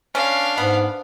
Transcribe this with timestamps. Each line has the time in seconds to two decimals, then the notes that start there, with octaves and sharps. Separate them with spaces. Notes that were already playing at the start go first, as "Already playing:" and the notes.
0.15 D3 C#4 D4 F5
0.58 G#2 B3